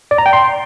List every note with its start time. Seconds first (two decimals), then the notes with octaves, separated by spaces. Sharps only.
0.11 D5
0.18 A#5
0.26 G5
0.33 C6